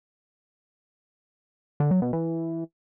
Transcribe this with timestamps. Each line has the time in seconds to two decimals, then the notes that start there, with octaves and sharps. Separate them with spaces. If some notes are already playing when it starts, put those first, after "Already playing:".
1.80 D3
1.91 F#3
2.02 B2
2.13 E3